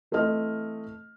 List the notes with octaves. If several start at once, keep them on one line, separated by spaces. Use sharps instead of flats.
E3 A3 C4 D#5 F6